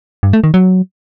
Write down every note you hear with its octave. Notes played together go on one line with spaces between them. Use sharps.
G2
A3
D#3
F#3